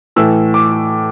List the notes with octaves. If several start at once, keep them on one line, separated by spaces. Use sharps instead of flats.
A2 E3 E6
D6